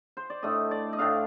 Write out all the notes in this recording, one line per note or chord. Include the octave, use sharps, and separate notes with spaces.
C5
D5
A2 A3 D4 D#5
D5
D#5
A2 A3 D4 F5